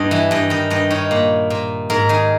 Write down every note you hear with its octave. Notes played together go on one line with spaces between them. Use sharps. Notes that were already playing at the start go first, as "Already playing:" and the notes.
Already playing: G2 D#5
E3
G2 D#5
D#3 D#5
G2 D#5
D#3 C#5
A#2
A#2
G#2 A#4
D#3 G#4